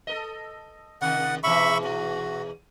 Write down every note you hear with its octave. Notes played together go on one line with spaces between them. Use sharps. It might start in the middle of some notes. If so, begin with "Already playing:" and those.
A4 A#4 D#5
C3 D#3 F#5
G#2 B2 E3 E5 B5 C#6
F#4